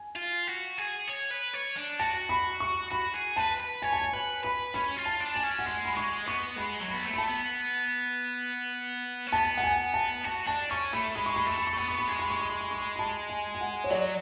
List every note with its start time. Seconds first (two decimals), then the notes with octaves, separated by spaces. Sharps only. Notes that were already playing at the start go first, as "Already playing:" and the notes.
Already playing: G#5
0.16 F4
0.47 F#4
0.78 G#4
1.08 C#5
1.31 B4
1.54 C#5
1.76 D4
1.99 F#4 A5
2.29 B5
2.60 C#6
2.91 F#4 B5
3.14 G#4
3.36 B4 A5
3.60 B4
3.82 C#5 G#5
3.93 A5
4.02 G#5
4.13 B4 G#5
4.43 B4 B5
4.74 C#4 B5
4.97 F4
5.06 A5
5.20 D4
5.35 G#5
5.43 C#4
5.59 F#5
5.65 G#3 G#5
5.85 B5
5.96 G#3 C#6
6.28 B3 C#6
6.57 G#3 B5
6.81 F#3
6.88 B5
6.93 B3
7.03 A3
7.13 B5
7.18 A5
7.27 B3
9.27 C#4
9.32 B3 A5
9.57 F#5
9.63 G#5
9.94 A5
10.24 F#4 A5
10.47 D4 A5
10.70 C#4 C#6
10.93 A3 B5
11.16 G#3 B5
11.26 C#6
11.36 B5
11.46 A3 C#6
11.58 B5
11.67 C#6
11.77 B3 B5
11.88 C#6
11.98 B5
12.08 G#3 C#6
12.19 B5
12.30 C#6
12.40 B5
12.50 C#6
12.61 B5
12.71 C#6
12.81 B5
12.96 B5
12.99 A5
13.29 G#5
13.55 G#5
13.61 F#5
13.84 C#5
13.90 F#3 D5